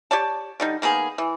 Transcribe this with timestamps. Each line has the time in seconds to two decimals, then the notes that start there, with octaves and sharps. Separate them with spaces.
0.11 G4 C#5 D5 A5
0.60 D3 G3 D#4
0.82 D#3 A#3 B3 G#4
1.18 E3